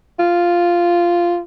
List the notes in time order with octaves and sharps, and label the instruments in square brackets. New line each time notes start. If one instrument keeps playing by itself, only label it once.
[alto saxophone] F4